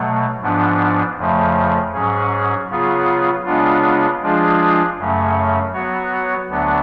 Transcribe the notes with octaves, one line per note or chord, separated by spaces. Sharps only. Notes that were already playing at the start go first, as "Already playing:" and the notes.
Already playing: B2 F#3 A3
G#2 F3 B3 D4
F2 C#3 F3 A3
G#2 F#3 C#4 G#4
C#3 F#3 B3 F4 G#4
C#3 G#3 B3 D4 F4
F3 G#3 D4 F4 G#4
F#2 C#3 F#3 A3 C#4
F#3 B3 F#4 C#5
D2 D3 F#3 B3